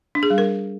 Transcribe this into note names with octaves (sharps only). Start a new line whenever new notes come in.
D4
G#4
G3
A#4